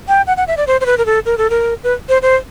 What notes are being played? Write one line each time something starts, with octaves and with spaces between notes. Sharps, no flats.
G5
F#5
F#5
E5
D5
C5
C5
B4
A#4
A4
A#4
A4
A#4
B4
C5
C5